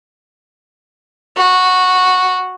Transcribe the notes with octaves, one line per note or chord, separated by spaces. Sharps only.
F#4